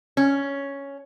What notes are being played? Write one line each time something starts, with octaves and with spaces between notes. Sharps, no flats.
C#4